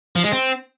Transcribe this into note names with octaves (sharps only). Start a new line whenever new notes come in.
F3
G#3
C4